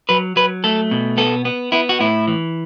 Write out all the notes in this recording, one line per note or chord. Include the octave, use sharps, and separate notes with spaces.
F#3 B4
F#3 B4
A3 A4
B2
B3 A4
B3
B3 E4
F#4
A2 E4
E3